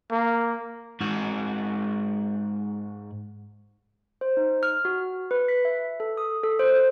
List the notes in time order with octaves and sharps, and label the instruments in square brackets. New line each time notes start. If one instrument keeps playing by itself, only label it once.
[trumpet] A#3
[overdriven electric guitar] G#2 F#4
[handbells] C5
D#4
F6
F#4
B4
B6
E5
A4
D#6
A4
C5